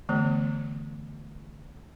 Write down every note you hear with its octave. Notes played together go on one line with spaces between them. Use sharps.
D3 E3 A3 B3